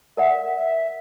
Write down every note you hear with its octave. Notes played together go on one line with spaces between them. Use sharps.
A#4 D5 E5 F#5
E5